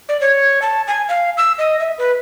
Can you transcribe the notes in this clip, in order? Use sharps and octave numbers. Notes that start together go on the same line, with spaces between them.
D5
C#5
A5
G#5
F5
E6
D#5
E5
B4